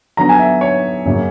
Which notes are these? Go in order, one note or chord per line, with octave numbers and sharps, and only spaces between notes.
D3 F#3 B3 A#5
G#5
E5
C#5
F#2 C#3 F#3 A#3